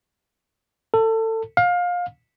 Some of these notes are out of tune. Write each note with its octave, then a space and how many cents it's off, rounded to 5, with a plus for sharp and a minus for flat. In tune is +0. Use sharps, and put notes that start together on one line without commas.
A4 +25
F5 +25